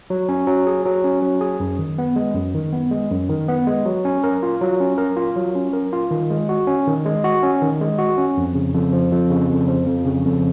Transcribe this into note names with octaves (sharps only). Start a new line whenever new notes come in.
F#3
C#4
F#3
G#4
F#3
C#4
F#3
G#4
F#2
D#3
B3
G#3
F#2
D#3
B3
G#3
F#2
D#3
B3
G#3
F#3
C#4
A#4
F4
F#3
C#4
A#4
F4
F#3
C#4
A#4
F4
D#3
G#3
F#4
C#4
D#3
G#3
F#4
C#4
D#3
G#3
F#4
C#4
F2
C#3
F2
F3
F2
C#3
F2
F3
F2
C#3
F2